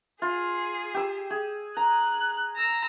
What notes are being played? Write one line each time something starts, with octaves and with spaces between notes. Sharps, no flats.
F4 G#4
G4 E6
G#4
A#5 F#6
A#5 E6